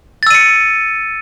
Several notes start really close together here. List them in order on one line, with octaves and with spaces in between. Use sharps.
A6 E6 D#7 C#7